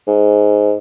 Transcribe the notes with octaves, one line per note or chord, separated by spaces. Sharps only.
G#2